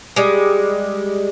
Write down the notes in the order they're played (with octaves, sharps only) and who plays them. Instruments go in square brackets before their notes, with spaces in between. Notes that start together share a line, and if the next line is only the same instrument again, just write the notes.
[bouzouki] G3 G#3